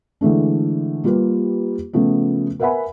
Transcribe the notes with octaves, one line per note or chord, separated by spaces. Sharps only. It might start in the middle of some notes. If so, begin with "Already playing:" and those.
D3 E3 G#3 A3 D4
G3 A#3 F4 G4 B4
C#3 F3 A3 B3
A#4 B4 E5 F#5 G#5 B5